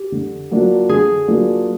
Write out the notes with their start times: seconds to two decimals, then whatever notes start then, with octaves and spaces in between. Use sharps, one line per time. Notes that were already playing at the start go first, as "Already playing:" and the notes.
Already playing: G4
0.12 D3
0.51 F#3 A#3 D4 F4
0.89 D3 G#4
1.27 F#3 A#3 D4 F4